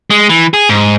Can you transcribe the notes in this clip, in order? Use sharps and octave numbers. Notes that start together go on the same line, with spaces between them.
G#3
E3
G#4
G#2